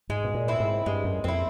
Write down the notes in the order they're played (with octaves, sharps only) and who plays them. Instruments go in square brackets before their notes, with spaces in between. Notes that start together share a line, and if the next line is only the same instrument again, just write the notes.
[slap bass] G#2 [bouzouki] G#3
[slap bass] B2
A#2
[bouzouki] C4 E4
[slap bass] G#2
[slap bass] G2 [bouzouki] G#3
[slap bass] F#2
[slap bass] F2 [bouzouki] C4 E4